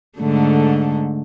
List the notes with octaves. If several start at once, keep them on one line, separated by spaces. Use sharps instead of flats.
G#2 D3 A3